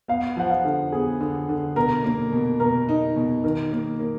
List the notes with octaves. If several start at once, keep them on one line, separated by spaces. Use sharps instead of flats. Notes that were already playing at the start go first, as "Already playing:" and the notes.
B3 F5
F3 F#5
F5
D3
B3 G#4
D3
D3
B2 A#4
A#3
B2
B2 A#4
D#4
B2
D#3 A#4
A#3
A#3